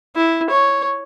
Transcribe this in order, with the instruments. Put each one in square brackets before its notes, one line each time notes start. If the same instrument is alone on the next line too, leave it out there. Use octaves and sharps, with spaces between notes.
[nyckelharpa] E4
C#5